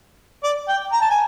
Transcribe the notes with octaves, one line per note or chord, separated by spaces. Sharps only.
D5
G5
A#5
A5
G#5